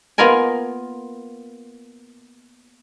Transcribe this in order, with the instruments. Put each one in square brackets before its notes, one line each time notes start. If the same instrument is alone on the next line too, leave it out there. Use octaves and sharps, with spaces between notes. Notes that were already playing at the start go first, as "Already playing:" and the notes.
[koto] A#3 B3 F4 A#4 G#5